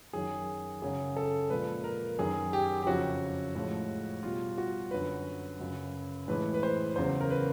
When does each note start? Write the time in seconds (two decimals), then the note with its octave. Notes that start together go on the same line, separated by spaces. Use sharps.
0.13 F#2 D#3 F#3 G#4
0.82 F#2 C#3 F#3 G#4
1.17 A4
1.50 A#2 F3 G#3 B4
1.84 A#4
2.19 F#2 D#3 F#3 G#4
2.53 G4
2.83 G4
2.86 F2 C#3 F#3 F#4
3.55 A2 F3 G#3
4.23 B2 G3 F4
4.58 F#4
4.91 F#2 D3 F#3 B4
5.59 F#2 C#3 F#3
6.28 A2 E3 G#3 B4
6.54 B4
6.63 C5
6.96 E2 C#3 F#3 C5
7.21 A#4
7.30 B4